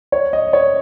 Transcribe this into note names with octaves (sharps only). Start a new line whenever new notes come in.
C#5
D#5
C#5